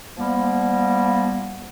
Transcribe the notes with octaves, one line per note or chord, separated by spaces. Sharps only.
F3 G3 A#3 B3